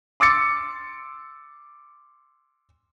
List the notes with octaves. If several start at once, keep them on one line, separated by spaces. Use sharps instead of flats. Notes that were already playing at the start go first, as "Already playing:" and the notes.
C6 D6 E6 A6 C#7